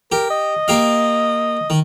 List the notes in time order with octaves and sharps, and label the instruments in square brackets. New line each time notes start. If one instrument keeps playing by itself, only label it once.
[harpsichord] G4 [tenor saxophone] A#4
[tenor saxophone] D#5
[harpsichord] A#3 G4 F5
D#3